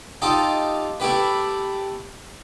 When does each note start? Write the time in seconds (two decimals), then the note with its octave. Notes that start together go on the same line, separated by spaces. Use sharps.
0.22 D#4 F4 G4 A4
1.00 A3 E4 G4 B4